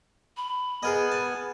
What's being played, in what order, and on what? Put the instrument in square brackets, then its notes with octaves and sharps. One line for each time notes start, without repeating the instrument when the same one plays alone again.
[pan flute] B5
[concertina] B3 G#5 [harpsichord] G#4 A#4 D#5
[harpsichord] A5